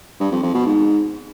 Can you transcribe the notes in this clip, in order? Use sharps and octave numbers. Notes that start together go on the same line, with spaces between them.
G2
F2
F2
B2
G#2